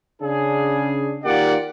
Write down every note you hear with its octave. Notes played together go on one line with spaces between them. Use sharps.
C#3 D4 G#4
D#3 A#3 F4 G4 D5 F#5